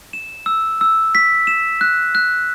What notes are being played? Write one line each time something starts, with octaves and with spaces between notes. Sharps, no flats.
E7
E6
E6
B6
E7
F#6
F#6